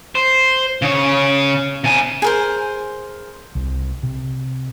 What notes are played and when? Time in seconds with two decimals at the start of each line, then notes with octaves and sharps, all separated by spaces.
0.15 C5
0.82 C#3 C#5
1.84 C3 G#5
2.22 G#4 A#4 C5
3.55 C2
4.03 C3